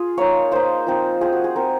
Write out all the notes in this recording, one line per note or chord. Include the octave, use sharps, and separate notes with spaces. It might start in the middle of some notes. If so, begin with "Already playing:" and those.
Already playing: F4 G#4
A#3 D#4 C#5
A#3 D#4 C5
F3 C4 D#4
F3 C4 D#4 G#4
F#4
G#4
G#3 C4 D#4 A#4